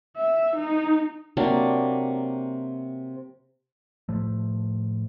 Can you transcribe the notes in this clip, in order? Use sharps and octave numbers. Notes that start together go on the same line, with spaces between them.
E5
D#4
C3 F#3 A#3 D4
A2 F3 A3